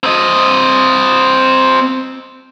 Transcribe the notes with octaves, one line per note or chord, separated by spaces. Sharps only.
C4 D#5